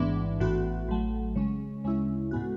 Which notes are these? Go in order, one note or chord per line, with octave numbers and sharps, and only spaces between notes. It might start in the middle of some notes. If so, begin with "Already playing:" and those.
Already playing: A1 G#2 E3 B3 D4
A1 A2 E3 B3 F#4
A1 A2 F#3 A3
C#3 G#3 C#4
D2 C#3 G#3 C#4 E4
A2 G#3 B3 F#4